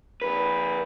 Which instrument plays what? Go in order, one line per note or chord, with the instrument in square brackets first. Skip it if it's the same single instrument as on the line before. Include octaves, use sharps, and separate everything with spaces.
[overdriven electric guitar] F2 B4